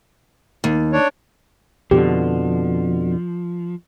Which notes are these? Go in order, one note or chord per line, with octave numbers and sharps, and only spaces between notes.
D#2
D4 C#5
F2 B2 D3 F3 G4